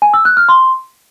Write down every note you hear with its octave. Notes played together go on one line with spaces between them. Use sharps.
G#5
E6
F#6
F6
C6